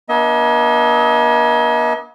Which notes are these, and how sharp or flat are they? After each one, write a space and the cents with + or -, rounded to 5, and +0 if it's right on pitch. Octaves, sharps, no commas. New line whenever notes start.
A#3 +45 D4 -10 D#5 +40